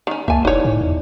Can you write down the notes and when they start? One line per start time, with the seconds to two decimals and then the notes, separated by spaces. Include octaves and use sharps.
0.07 D#3 C#4
0.28 C#2 A#3 E5 G#5 A5
0.45 F1 D#4 E4 B4 C#5 D5
0.65 A2
0.81 E2